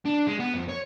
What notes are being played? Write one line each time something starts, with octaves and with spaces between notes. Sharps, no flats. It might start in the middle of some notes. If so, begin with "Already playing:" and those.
D4
G#3
B3
F2
C#5